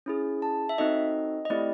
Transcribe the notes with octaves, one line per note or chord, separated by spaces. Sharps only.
C#4 E4 G#4
A5
E5
C4 D#4 F#4 A4 D#5
D#5
A3 C4 E4 G4 D5